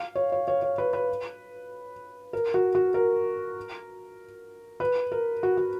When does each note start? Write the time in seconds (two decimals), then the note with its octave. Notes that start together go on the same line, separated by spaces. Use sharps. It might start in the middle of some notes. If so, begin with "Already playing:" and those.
Already playing: F5
0.16 C#5
0.32 C#5
0.48 C#5
0.62 C#5
0.78 B4
0.93 B4
2.33 A#4
2.54 F#4
2.75 F#4
2.94 A#4
4.80 B4
5.12 A#4
5.43 F#4
5.57 F#4